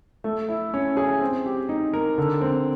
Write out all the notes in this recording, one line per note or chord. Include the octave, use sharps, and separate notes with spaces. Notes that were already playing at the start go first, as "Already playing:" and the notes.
A3
E4
C#4
G#4
C4
G4
D#4
A#4
D3
C4